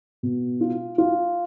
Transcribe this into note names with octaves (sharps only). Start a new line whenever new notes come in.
B2
F4
F4